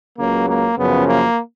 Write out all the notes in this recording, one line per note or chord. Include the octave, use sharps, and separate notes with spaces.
C#2 C#3 F#3 A#3
A#3
F#2 C#3 F3 B3
A#3